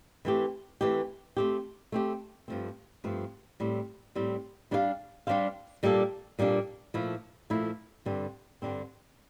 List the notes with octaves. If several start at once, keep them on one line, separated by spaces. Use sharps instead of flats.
E3 A3 C4 G4
E3 A3 C4 G4
A3 C4 G4
A3 C4 G4
G2 F3 A3 C4
G2 F3 A3 C4
A2 G3 C4
A2 G3 C4
G3 D4 G4 C5 F5
G3 D4 G4 C5 F5
A#2 G3 A#3 D4 A4
A#2 G3 A#3 D4 A4
A#2 F3 A3 E4
A#2 F3 A3 E4
G2 D3 G3 C4
G2 D3 G3 C4